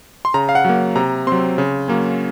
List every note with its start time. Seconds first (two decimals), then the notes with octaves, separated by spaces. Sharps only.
0.25 C6
0.34 C#3 A#5
0.49 F5
0.55 F#5
0.65 F#3 A#3
0.96 C3 A#5
1.27 F#3 C4 C6
1.58 C#3
1.88 F#3 A#3 C#4